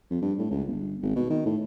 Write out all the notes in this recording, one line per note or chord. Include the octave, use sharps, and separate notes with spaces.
F2
G2
A2
C#2
G1
G#1
B2
D#3
A2